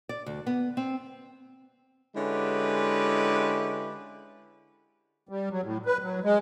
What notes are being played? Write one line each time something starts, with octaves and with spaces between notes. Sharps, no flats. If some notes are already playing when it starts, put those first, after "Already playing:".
D5
D2
B3
C4
D3 G#3 C#4 E4 G4 B4
G3
F#3
A2
B4
F#3
G#3